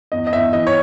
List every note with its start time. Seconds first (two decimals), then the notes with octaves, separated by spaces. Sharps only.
0.12 E2 D#5
0.27 D#5
0.33 E2 E5
0.53 E3 D#5
0.67 C#5